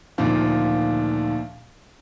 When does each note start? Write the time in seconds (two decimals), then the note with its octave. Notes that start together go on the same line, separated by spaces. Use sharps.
0.18 D2 A#2 D#3 F3